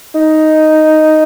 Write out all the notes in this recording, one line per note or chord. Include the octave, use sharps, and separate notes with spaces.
D#4